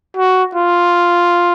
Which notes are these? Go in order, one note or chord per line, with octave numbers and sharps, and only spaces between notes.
F#4
F4